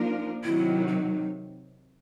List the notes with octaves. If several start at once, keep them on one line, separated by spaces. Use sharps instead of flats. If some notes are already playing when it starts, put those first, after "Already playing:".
Already playing: F3 A#3 D4 D#4 F4 A#4
C3 D#3 F#3 E4
D#4